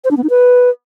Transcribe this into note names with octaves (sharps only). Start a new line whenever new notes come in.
C5
D4
B3
D#4
B4